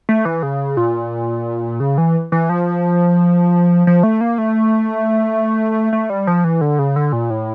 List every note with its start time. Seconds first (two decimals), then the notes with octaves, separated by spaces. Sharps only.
0.09 A3
0.25 E3
0.43 C#3
0.77 A#2
1.80 C#3
1.98 E3
2.32 E3
2.49 F3
3.87 F3
4.03 A3
4.21 A#3
4.38 A3
5.93 A3
6.10 G3
6.27 F3
6.44 E3
6.61 D3
6.79 C#3
6.96 D3
7.13 A#2
7.30 A2